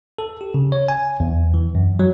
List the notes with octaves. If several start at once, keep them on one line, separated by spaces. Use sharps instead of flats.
A4
G4
C#3
C#5
G#5
E2
E3
F#2
F#3